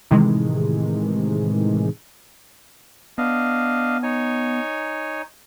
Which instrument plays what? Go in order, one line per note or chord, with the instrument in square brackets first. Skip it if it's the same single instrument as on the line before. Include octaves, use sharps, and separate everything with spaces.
[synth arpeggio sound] A2 C3 D#3 E3 G#3
[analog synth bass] B3 [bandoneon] D4 D#5 F5
[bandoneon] D#4 C#5 G#5